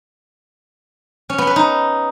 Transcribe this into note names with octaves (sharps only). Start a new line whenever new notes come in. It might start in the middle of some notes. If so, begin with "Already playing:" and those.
C#4
B3
B4
D#4